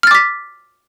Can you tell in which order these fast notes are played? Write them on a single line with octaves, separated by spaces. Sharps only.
F6 A6 D6 B6